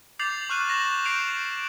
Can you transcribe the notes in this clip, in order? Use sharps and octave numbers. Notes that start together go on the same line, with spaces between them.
D6 G6 A6 C7 F7 F#7
C#6 F6 F#6 D#7 F#7
C#6 A#6 E7
G6 C7 D7 F7
D7